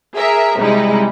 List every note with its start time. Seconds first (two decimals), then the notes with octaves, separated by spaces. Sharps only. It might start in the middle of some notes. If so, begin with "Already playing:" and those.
0.17 G#4 A#4 E5
0.59 C3 G3 G#3 D#4 E4